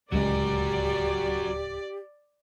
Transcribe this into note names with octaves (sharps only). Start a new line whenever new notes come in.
D1 C#2 F#3 G#3 G4 A#4 D5